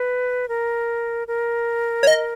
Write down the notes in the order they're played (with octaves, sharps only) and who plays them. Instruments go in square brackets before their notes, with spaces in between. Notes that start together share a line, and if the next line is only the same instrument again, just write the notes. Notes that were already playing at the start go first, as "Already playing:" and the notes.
Already playing: [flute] B4
A#4
A#4
[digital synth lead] C#5
D#5